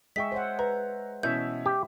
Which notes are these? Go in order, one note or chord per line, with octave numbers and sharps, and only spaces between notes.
G#3 G#4 D#5 E5 G5 C#6 B6
C5 C#5 F#5
B4 A#5
B2 E3 C#4 E5 G6
G4